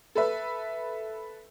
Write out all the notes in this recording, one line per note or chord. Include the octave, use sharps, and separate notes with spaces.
A4 B4 E5